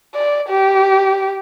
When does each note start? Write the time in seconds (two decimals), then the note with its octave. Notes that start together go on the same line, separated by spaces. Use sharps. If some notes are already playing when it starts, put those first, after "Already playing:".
0.15 D5
0.50 G4